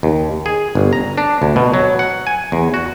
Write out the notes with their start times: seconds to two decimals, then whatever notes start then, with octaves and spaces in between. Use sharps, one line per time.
0.03 D#2
0.46 G#4
0.75 G1
0.93 A#5
1.18 D4
1.42 D2
1.56 B2
1.74 F#3
1.99 F#5
2.27 G#5
2.52 E2
2.74 F#4